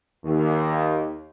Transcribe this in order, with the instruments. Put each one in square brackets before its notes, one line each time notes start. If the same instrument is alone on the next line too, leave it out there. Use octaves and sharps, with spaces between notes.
[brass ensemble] D#2